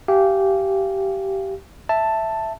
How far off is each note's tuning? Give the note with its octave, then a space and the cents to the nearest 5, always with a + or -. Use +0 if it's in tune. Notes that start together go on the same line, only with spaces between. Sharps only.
G4 -15 F5 -30 G#5 +0
E5 +0 A5 +5